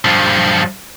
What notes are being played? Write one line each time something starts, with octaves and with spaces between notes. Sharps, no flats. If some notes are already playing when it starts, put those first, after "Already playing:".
G2 F3